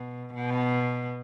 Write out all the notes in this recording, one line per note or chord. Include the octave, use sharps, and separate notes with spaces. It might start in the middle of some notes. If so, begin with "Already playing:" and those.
Already playing: B2
B2